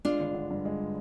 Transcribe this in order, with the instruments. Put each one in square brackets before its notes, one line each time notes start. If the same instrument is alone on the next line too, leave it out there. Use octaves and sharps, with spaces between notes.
[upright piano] G#3 [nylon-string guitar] D4 F4
[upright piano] G1
D3
G2
G#3